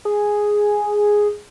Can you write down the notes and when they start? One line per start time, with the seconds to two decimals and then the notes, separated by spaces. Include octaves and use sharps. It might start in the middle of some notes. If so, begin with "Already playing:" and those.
0.05 G#4